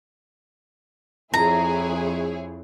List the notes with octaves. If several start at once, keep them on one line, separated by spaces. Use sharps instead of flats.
F2 E4 G#4 C#5 A#5